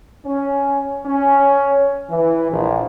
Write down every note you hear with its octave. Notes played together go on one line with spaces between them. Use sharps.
C#4
C#4
E3
A#1